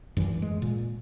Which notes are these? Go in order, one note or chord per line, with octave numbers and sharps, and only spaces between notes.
F#2 E3
G#3
A#2